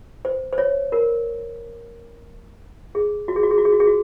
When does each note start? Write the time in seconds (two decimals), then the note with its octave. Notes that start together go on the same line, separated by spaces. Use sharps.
0.25 C5
0.53 C5
0.58 C#5
0.92 A#4
2.95 G#4
3.28 F#4
3.36 G#4
3.43 F#4
3.51 G#4
3.58 F#4
3.65 G#4
3.72 F#4
3.80 G#4
3.87 F#4